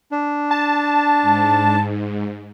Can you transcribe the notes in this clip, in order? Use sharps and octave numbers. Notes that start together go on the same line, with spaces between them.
D4
A5
G#2